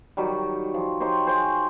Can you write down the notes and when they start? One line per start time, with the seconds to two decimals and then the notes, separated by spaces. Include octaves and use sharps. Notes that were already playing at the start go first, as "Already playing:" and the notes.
0.17 D#3 F#3 G3
0.74 F3
1.00 D#4 G4 C5 C#5
1.26 G#4 C5 C#5 G5